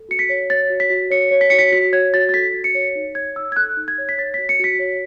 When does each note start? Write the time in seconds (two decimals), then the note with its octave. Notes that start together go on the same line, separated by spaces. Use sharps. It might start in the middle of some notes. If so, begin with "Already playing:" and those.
Already playing: A4
0.09 F#4 C#7
0.19 B6
0.29 C#5
0.50 C#5 A6
0.70 F#4
0.80 B6
0.90 F#4
1.10 C#5 C#7
1.31 C#5
1.41 B6
1.50 F#4 C#7
1.59 B6
1.72 F#4 B6
1.93 C#5 G#6
2.14 F#4 A6
2.29 A6
2.34 A4 B6
2.54 F#4
2.64 C#7
2.75 C#5
2.95 D#4
3.15 C#5 G#6
3.36 D#4 E6
3.52 G#6
3.56 A4 F#6
3.77 D#4
3.88 G#6
3.98 C#5
4.09 B6
4.18 C#5 A6
4.34 F#4 B6
4.49 C#7
4.59 F#4 B6
4.79 C#5